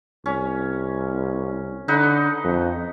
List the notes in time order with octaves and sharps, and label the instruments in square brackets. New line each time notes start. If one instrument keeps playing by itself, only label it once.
[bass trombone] C2 [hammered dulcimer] C#4
[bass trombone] D3 [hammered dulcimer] D#4 B4 F#5
[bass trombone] F2